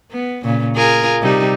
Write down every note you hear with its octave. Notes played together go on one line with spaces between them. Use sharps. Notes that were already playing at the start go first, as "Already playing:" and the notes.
B3
A#2 C#3
F4 G#4 A#4
C3 G3 D#4